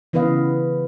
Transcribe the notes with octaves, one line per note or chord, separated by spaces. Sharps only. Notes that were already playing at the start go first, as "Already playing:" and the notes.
C#3 E3 B3 B4 D#5 F5